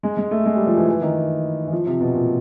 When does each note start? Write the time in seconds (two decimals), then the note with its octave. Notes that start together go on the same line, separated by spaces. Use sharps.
0.03 G#3
0.17 G#3
0.31 A3
0.46 G#3
0.56 G3
0.67 F3
0.77 E3
0.88 E3
1.02 D#3
1.67 E3
1.72 F3
1.86 C3
2.00 B2
2.14 A#2